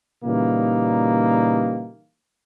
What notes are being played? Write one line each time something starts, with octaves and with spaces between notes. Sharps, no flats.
A#2 C#3 E3 G3 A#3 D#4